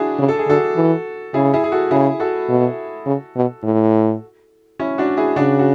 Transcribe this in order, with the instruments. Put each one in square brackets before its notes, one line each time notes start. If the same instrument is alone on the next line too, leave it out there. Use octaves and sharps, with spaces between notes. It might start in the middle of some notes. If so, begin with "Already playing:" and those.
Already playing: [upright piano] D4 E4 F#4 G#4
[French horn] C#3
[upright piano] A4
G#4
[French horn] D3 [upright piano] F#4 A4
[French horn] E3
[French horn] C#3 [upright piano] E4 G#4
[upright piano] E4 G#4
G#4
F#4 A4
[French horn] C#3 [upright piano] E4 G#4
[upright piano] F#4 A4
[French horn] B2
C#3
B2
A2
[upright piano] C#4 E4
D4 F#4
E4 G#4
[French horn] C#3 [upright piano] D4 F#4
[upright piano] F#4